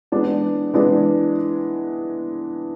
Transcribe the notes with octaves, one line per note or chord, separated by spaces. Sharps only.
E3 G#3 B3 D4
E3 G#3 B3 D4